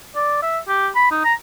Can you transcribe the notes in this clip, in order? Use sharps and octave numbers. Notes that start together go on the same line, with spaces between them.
D5
E5
G4
B5
D#4
A#5